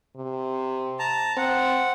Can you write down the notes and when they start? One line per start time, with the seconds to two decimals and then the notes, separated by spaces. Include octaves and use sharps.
0.16 C3
0.99 A5 A#5
1.37 C4 F#5